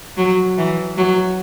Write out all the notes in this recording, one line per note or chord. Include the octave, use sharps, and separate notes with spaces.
F#3
E3
F#3